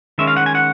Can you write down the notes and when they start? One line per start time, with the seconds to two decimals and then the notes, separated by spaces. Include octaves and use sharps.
0.18 D#3 G#3 C#4 E5
0.27 F5
0.37 F#5
0.46 G#5
0.55 F#5